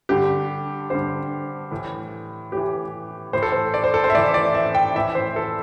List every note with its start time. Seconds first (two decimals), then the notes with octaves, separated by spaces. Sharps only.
0.09 G2 D3 G4
0.90 G2 D3 C5
1.71 A2 E3
2.52 A2 E3 G4
3.33 A2 E3 C5
3.43 A4
3.52 C5
3.74 D5
3.84 C5
3.94 A4
4.04 C5
4.10 E5
4.14 A2 E3 D5
4.34 D5
4.54 E5
4.75 G5
4.95 A2 E3 E5
5.15 C5
5.36 A4